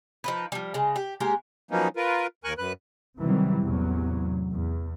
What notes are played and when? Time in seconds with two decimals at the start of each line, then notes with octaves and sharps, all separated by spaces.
0.24 F3 D#4 B4
0.52 F3 G3
0.74 C#3 G#3
0.96 G4
1.20 G#3 A#3 G4 A#4
1.71 F3 F#3 A#3 B3 C#4 D#4
1.96 F4 A#4 B4
2.44 D#2 A#4 G#5 C#6 F#6
2.58 F#2 B4 F#6
3.20 C3 D#3 E3 F#3 G3 C4
3.60 A1 E2 C3 F#3
4.53 E2